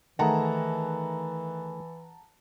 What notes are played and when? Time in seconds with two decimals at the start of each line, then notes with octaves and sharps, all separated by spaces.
0.19 D#3 E3 A3 G#4 F#5 A5 A#5